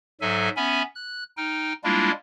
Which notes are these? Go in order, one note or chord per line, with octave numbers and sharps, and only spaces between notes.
G#2 F#3 A4 E5 G#5
B3 C#4 E5 G#5 B5
F#6
D#4 G5 F6
G3 G#3 A#3 D4 E4 F4